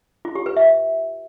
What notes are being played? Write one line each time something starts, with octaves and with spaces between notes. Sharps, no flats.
F4
G4
B4
E5